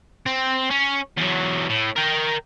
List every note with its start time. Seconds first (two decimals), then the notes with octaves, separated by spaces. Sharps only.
0.26 C4
0.70 C#4
1.17 E2 F#3
1.69 A2
1.96 A#4 G5